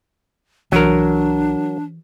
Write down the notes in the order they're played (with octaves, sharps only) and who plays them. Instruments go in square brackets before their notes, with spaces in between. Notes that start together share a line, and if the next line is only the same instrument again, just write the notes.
[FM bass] C2 [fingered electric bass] E3 [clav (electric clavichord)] F#3 A#4 [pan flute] D4